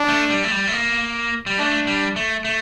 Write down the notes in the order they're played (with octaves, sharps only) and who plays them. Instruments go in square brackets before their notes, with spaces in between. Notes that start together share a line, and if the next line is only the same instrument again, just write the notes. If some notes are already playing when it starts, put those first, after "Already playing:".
Already playing: [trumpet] D4
[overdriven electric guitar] A3
G3
A3
G3
A3
A#3
G3
[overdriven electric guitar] A3 [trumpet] D4
[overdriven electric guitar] G3
A3
A3